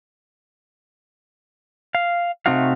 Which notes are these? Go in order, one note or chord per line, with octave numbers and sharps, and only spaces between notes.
F5
C3 A3 C4 D#4 F#4 F5